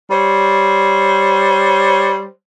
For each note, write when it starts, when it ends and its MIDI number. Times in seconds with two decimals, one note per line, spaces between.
0.10 2.25 55
0.10 2.25 72
0.10 2.25 73